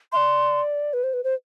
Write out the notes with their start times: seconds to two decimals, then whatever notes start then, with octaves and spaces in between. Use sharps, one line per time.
0.13 E5 C6
0.16 D5
0.93 B4
1.03 C5
1.14 B4
1.24 C5